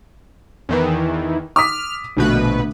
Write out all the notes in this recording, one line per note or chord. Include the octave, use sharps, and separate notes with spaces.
E2 D#3 E3
D6 D#6 F6 B6
A#1 B2 D3 A3 B4